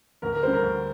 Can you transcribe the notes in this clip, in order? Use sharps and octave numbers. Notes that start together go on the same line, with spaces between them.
D2 A#4
A#4
D3 G3 C5
A#4
D2